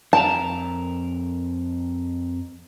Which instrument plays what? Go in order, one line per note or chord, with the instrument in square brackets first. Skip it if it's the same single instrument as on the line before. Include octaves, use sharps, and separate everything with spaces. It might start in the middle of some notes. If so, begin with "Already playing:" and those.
[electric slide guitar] F2 A#4 A#5 [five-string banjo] A5